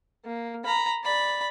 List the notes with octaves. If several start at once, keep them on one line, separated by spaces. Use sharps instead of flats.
A#3
A#5 B5
D5 B5